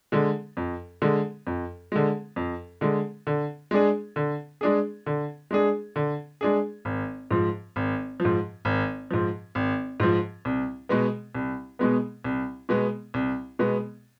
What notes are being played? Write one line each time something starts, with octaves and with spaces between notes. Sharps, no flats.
D3 G#3
F2
D3 G#3
F2
D3 G#3
F2
D3 G#3
D3
G#3 D4 G#4
D3
G#3 D4 G#4
D3
G#3 D4 G#4
D3
G#3 D4 G#4
G#1
G#2 F3
G#1
F3
G#2
G#1
G#2 F3
G#1
G#2 F3
C2
B2 G#3 B3
C2
B2 G#3 B3
C2
B2 G#3 B3
C2
B2 G#3 B3